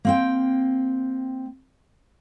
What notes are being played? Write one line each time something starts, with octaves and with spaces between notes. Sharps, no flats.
A#3 C4 G5